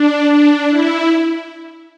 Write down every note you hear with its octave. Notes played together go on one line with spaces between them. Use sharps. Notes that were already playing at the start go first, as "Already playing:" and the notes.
Already playing: D4
D4
E4